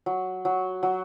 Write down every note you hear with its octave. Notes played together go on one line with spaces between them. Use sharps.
F#3
F#3
F#3